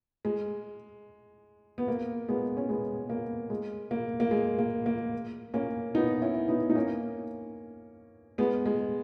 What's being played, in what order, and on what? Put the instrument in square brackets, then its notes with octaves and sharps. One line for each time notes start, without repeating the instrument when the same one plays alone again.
[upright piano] G#3
B3
A#3
G#3 B3
C#4
G#3 B3
A#3
G#3
A#3
A#3
G#3
A#3
A#3
A#3 C#4
B3 D#4
C#4 E4
B3 D#4
D#4
A#3 C#4
G#3 B3
G#3